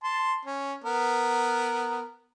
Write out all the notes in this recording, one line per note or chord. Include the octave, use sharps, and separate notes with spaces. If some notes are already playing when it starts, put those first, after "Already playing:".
A5 C6
C#4
B3 A#4